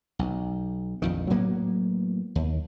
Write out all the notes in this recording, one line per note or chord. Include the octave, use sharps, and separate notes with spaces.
B1
A#1 F2 D#3
A2 F#3 A#3 B3
D#2